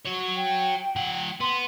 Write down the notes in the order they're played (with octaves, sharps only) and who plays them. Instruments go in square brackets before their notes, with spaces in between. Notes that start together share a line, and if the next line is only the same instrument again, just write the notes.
[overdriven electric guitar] F#4 C#5
[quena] G5
[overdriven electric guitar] F3 F#5
[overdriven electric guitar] B3 [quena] C6